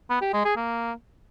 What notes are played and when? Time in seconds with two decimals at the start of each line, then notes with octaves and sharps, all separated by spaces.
0.10 B3
0.22 G4
0.33 G#3
0.45 G#4
0.56 A#3